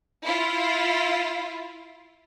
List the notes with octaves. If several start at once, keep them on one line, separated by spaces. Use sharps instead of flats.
E4 F4